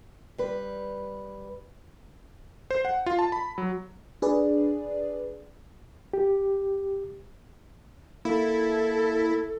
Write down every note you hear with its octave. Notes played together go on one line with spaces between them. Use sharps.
G3 B4
C5
F#5
F4
A5
B5
F#3
D4 G#4 B4 D5
G4
A#3 E4 A4